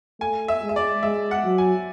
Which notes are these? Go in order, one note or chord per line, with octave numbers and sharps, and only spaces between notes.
A3 G#5
E5
G#3
E5
D5
G#3 E5
F#5
F#3
G#5